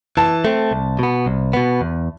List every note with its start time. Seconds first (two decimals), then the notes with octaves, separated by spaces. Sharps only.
0.17 E3 A5
0.45 A3 C4
0.71 C2
0.99 B2 B3
1.26 C2
1.53 B2 B3
1.81 E2